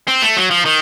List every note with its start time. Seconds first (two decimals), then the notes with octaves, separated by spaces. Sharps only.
0.08 C4
0.22 A3
0.37 F#3
0.51 F3
0.65 D#3